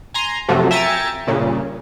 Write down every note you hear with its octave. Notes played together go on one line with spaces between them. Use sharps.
G#5 A#5 C6
F#2 C3 F3 F#3 A3
E5 G5 G#5 A#5 A6 C#7
G2 A#2 C#3